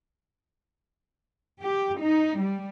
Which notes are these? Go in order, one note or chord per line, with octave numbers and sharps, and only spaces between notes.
G4
D#4
G3